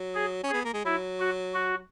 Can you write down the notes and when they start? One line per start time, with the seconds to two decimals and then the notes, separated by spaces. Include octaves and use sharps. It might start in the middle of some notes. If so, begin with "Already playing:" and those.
Already playing: F#3
0.15 G#4
0.44 C#4
0.50 B3 G#4
0.65 A#3
0.74 G#3
0.85 F#3 E4
1.20 F#4
1.54 F#4